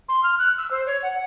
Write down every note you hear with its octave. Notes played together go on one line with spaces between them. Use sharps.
C6
F6
F#6
E6
C5
C#5
F#5